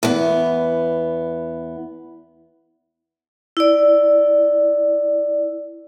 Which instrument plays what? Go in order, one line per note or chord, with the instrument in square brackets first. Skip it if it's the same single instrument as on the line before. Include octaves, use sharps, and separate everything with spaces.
[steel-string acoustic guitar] E2 B3
[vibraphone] E4 D5